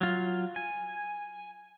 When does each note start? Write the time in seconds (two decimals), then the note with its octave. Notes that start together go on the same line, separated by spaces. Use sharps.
0.01 F#3 F4
0.56 G#5